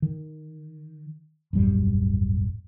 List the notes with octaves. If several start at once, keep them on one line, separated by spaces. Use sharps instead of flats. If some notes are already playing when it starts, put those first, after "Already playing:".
D#3
D#1 G#1 F#2 G3